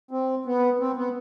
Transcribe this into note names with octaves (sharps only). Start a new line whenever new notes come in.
C4
B3
C4
B3